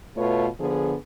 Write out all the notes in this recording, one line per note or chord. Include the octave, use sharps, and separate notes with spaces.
B2 A3 F4 B4 C#5
D3 F3 B3 G#4